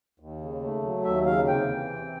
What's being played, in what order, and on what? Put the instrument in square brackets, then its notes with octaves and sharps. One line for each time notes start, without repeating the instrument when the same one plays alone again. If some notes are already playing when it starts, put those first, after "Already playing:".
[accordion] D#2
C#3
A3
F#3
D#2 E5
C#3 F5
C3 G5
E3
C4